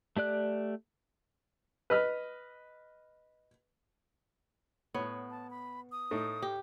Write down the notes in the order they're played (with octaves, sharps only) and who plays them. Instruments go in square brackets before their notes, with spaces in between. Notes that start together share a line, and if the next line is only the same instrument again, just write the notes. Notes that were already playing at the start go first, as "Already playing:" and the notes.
[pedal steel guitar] A3 G4 D5 F#6
[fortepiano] B4 D#5 F6
[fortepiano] A2 C#5 [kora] B3
[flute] A5
B5
D#6
[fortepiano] A2 A3 D#4
[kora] G4